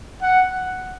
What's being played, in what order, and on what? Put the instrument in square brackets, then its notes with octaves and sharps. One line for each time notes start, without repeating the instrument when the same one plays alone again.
[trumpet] F#5